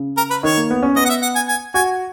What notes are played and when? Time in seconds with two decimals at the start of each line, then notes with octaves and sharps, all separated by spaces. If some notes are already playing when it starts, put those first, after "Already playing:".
Already playing: C#3
0.17 A#4
0.30 B4
0.43 D#3 C#5
0.57 A#3
0.71 B3
0.83 C#4
0.96 B3 D#5
1.05 F#5
1.09 E5
1.22 F#5
1.35 G#5
1.48 G#5
1.74 F#4 G#5